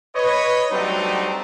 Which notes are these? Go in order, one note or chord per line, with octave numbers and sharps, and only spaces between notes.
B4 C#5 D#5
F#3 G3 A3 C4 D4 D#4